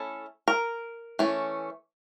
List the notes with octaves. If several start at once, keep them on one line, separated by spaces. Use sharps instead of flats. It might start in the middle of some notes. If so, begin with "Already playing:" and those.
Already playing: A3 C#4 E4 A4
A#4
E3 A3 C#4